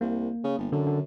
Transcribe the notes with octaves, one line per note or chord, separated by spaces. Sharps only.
C2 A#3
C#3
G1
F#2 D3
D3